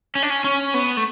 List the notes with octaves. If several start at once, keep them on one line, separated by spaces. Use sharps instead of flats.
C#4
D4
C#4
C#4
B3
A3